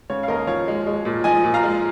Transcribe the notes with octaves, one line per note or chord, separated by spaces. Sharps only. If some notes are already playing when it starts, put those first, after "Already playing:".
C#3 C#5
F5
D#2 A#4 D#5
F3 C#5 F5
G#3
G#3
A#2
F3 D#5 G#5
A#2
F5 A#5
G#3